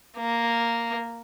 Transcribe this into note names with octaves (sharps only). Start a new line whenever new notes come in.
A#3